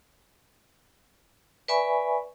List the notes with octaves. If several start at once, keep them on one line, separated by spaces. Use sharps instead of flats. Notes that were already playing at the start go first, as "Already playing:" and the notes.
B4 D5 E5 G#5 B5 C#6